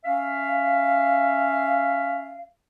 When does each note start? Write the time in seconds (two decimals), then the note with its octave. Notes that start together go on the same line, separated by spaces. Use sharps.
0.05 C#4 E5 F5